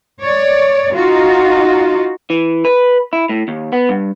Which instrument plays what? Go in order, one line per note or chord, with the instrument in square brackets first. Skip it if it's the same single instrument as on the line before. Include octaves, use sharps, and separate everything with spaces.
[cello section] C#5 D5
D#4 F4 F#4
[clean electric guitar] E3
B4
E4
A2
D#2
B3
G2